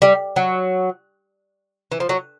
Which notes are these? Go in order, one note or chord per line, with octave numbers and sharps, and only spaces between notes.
G3
F#3
E3
F3
F#3